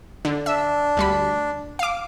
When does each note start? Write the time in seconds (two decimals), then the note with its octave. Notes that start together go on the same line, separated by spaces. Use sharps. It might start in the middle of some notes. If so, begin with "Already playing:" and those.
0.25 D3
0.46 D4 E5
0.97 D2 G3 B5
1.79 F5 D6